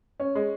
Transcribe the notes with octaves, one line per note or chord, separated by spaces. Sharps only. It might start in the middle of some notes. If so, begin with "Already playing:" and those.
C#4
G#3